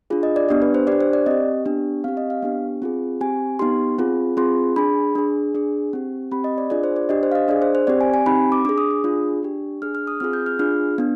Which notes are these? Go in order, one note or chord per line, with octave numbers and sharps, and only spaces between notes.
D4 F4 G#4
D#5
D5
B3 D4 G4
B4
C5
D4 G4 D5
C5
D5
C4 G4 D#5
B3 D4 G4
C4 G4 F5
D#5
F5
B3 D4 G4
C4 F4 G#4
C4 G4 G#5
B3 D#4 G4 C6
C4 F4 G#4
C4 F4 G#4 C6
D4 G#4 B5
D4 G#4
D4 G#4
C4 G4
C4 G4 B5
D#5
D5
D4 F4 G#4 D5
C5
D5
D4 G4 D#5
C5
F5
D#5
D4 G#4 D5
C5
C5
C4 G4 D5
G#5
G#5
C4 D#4 G4 B5
D6
D4 G#4 D6
D#6
D#6
D4 F4 G#4
D4 G4
D4 G#4 F6
F6
D#6
C4 F4 G#4 F6
G6
F6
D4 F4 G#4 F6
B3 D4